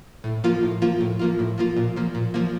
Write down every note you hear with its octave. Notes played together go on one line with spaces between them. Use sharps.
A2
F3 A#3 F4
A2
F3 A#3 F4
A2
F3 A#3 F4
A2
F3 A#3 F4
A#2
F3 A#3
A#2
F3 A#3